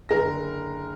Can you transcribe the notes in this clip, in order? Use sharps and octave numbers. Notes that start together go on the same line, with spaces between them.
F#1 D3 A#4 A#6